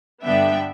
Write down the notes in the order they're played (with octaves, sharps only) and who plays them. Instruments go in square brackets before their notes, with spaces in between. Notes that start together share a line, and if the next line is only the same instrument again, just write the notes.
[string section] G2 D3 G3 B3 D4 E5 G5